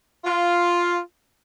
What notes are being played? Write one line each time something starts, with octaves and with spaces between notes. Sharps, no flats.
F4